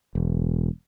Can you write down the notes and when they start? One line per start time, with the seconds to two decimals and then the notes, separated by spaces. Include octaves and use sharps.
0.15 E1